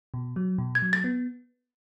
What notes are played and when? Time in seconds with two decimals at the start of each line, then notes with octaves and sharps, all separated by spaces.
0.14 B2
0.36 F#3
0.58 B2
0.75 G#6
0.82 F#3
0.93 A6
1.04 B3